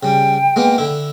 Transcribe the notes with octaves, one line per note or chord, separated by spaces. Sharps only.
C#3 G3 G5
G#3 A#3 B3
D3 E4